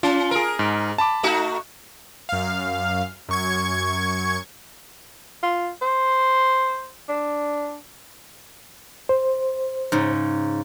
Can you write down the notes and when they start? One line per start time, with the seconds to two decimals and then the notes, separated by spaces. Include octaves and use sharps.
0.03 C#4 F4
0.31 G#4 A#4
0.59 G#2
0.98 A5 B5 D6
1.23 A3 D#4 F#4
2.29 F#2 F5
3.29 F#2 C#6 G#6
5.43 F4
5.82 C5
7.09 D4
9.09 C5
9.92 G#2 C#3